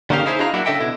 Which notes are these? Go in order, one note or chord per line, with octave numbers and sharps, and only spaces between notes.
D3 A#3 C#4 D#4 G4 F5
D#4 E4 G#4 C5
D4 E4 F#4 D#5 F5 A#5
F#3 A#3 D4 E4 F#4
C#3 D4 A4 D#5 E5 G5
B2 D3 E4